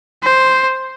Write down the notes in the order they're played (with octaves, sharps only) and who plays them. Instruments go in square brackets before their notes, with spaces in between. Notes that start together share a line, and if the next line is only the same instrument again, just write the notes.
[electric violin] C5